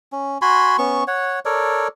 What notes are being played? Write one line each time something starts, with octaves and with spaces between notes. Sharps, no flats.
C#4
F#4 G#5 B5 C6
B3 C#4 C#6
C#5 F#5
A4 A#4 C#5 D5